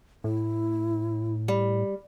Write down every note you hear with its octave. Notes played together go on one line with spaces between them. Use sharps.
A2 E4
G3